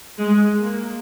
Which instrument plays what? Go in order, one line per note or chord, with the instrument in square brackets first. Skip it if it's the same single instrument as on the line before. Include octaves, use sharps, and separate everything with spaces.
[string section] G#3
A#3